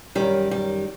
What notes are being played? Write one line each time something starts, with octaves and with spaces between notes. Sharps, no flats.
F#2 D#3 G3
G3